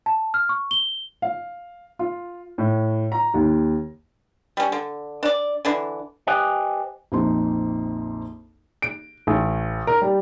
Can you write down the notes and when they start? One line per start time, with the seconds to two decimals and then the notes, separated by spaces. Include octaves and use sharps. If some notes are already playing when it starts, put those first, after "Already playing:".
0.06 A5
0.34 F6
0.49 C#6
0.71 G7
1.22 F5
1.99 F4
2.58 A2
3.12 A#5
3.34 D#2
4.57 G3 C#4
4.72 D3
5.23 D4 D5
5.65 D3 E3 D4
6.27 G4 B4 C5 D#5 G5 G#5
7.12 A#1 F2 C4 D#4 C6
8.82 D7
9.27 A1
9.87 A#4
10.02 G3